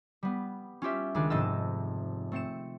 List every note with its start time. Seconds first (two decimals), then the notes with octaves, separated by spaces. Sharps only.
0.23 G3 B3
0.82 C#4 F4 G4 E5
1.15 C#2 D#3 D4 G#4
1.30 F1 G#2 C4 D#5 A5 E6
2.32 A3 C4 C#7 E7